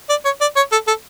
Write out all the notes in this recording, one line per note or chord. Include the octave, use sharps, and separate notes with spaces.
D5
C#5
D5
C#5
A4
A4